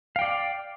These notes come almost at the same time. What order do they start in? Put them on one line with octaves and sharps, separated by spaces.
F5 G5 D5